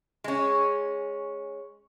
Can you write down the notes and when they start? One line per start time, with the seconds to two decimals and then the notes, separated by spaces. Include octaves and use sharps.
0.24 G#3 C#4